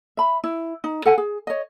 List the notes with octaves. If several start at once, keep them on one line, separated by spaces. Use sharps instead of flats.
E5 B5
E4
D#4
A4 F#5 G#5
G#4
C#5 D#5